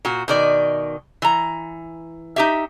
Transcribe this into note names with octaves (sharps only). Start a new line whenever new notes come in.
A#2 F#4
B2 D#3 D5
E3 A#5
D#4 G4 E5